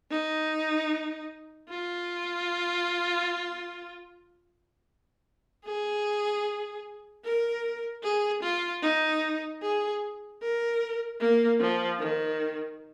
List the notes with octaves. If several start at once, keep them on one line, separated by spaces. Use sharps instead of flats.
D#4
F4
G#4
A#4
G#4
F4
D#4
G#4
A#4
A#3
F3
D#3